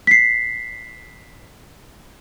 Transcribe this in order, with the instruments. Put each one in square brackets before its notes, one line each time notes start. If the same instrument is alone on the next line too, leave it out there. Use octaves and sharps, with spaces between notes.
[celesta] B6 C7